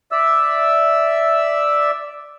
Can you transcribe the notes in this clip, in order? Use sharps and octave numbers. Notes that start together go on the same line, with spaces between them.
D5 E5 E6